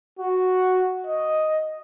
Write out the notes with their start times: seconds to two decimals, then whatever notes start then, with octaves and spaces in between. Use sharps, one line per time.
0.19 F#4
1.07 D#5